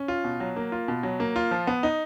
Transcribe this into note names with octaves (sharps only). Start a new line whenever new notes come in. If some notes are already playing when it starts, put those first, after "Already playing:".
Already playing: C#4
F4
B2
F#3
A#3
F4
B2
F#3
A#3
F4
F3
B3
D#4